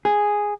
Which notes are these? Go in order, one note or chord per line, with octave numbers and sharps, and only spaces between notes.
G#4